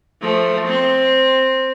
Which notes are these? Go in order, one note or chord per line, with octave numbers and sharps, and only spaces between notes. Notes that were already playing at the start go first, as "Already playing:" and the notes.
F3 A3
C4